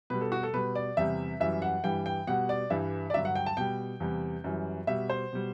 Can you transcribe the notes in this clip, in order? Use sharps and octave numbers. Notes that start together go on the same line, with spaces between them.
B2 G3 B4
A4
F#4
A4
B2 G3 B4
D5
E2 C3 G3 E5
F#2 E3 G3 E5
F#5
G2 E3 G3 G5
G5
B2 G3 F#5
D5
G2 E3 G3 E5
D5
G2 D3 F#3 E5
F#5
G5
A5
B2 G3 G5
E2 C3 G3
F#2 E3 G3
B2 G3 E5
C5
B2 G3